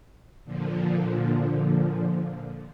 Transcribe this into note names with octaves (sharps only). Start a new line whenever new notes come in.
A#2 D3 F3